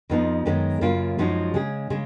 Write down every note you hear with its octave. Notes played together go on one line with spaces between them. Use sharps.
F2 F3 B3 D#4
F#2 D#3 G#3 B3
F#2 C#3 F#3 A#3 F4
F#2 F3 G#3 D#4 F#4
C#3 G#3 C#4 G#4
C#3 G#3